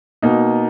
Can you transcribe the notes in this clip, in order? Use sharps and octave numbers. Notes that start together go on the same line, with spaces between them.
B2 A#3 D#4